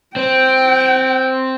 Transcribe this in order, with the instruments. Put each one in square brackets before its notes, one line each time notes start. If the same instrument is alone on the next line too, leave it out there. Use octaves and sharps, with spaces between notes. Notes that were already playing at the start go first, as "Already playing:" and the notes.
[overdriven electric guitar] C4 [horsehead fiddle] G5